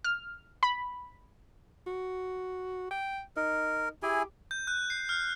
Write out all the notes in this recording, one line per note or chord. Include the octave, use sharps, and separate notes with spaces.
F6
B5
F#4
G5
D#4 A#4
E4 G4 G#4 G#5
G6
F#6
C7
F6